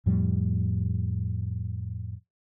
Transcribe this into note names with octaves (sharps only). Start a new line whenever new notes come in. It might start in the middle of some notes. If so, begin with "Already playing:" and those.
F2 A2 F3 G3